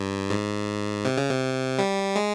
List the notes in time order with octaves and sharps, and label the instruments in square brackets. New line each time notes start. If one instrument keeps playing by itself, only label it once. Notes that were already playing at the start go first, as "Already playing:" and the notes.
Already playing: [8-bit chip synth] G2
G#2
C3
C#3
C3
G3
G#3